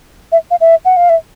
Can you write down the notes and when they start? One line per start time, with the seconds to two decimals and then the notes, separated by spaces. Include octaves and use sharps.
0.32 E5
0.51 F5
0.61 E5
0.85 F#5
0.97 F5
1.09 E5